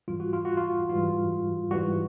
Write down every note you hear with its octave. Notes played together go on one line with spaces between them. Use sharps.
G#2 E3 G3 F4
F#4
F4
F#4
F4
G#2 E3 G3 F4
G#2 E3 G3 F#4